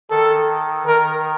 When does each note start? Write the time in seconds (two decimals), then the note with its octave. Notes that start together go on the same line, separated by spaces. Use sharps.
0.10 D#3 A4
0.87 D#3 A#4